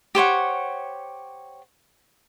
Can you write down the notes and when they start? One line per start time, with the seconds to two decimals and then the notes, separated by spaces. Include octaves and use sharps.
0.15 G4 C5 C#5 F#5